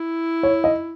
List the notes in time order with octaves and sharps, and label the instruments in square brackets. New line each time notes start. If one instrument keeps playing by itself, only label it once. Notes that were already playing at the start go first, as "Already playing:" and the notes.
Already playing: [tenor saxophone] E4
[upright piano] C#5
D#5